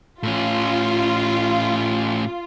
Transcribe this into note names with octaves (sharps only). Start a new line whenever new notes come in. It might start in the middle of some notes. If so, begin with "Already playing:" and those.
A2 C#4 F4